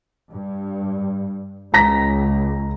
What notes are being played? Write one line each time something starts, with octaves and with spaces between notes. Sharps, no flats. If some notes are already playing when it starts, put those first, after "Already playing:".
G2
C#2 A#5 A#6 B6